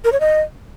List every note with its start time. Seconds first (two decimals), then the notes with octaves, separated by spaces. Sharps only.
0.05 A#4
0.12 C#5
0.20 D#5